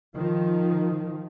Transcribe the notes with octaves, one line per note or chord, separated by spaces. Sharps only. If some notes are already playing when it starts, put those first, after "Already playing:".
D#3 F3